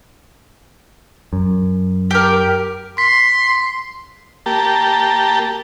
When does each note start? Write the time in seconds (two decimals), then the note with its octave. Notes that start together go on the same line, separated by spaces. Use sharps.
1.33 F#2
2.11 G4 A#4
2.98 C6 B6
4.46 A#3 G4 A5